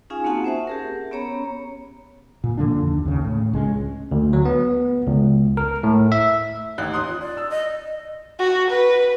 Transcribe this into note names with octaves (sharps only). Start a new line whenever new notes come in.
C#4 D#4 F4 G#4 F5 G#5
A#3 C4 D#4 F#4 F#5 A5
C#4 C5 E5 F#5
G4 G#4 A#4
B3 C#4 C#5 A#5 B5
A#2
F2 D3 A#3 D4
D#2
D#2 C#3
A2
C#2 G#3 C#4
D2
F#3
B3
C#2
A#4
A2
E5
A1 D#2 F#6
C6 D#6 F#6
F4
D5
E6
D#5
F#4
B4